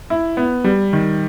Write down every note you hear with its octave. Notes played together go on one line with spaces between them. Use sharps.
E4
B3
G3
D#3